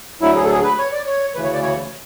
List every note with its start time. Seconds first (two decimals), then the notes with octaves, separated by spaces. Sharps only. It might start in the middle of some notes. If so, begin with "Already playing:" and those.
0.21 D2 D3 F#3 E4
0.36 G#4
0.43 A4
0.50 G#4
0.63 B4
0.78 C#5
0.92 D5
1.06 C#5
1.35 D2 C#3 E3 B4
1.44 C#5
1.54 D5
1.62 C#5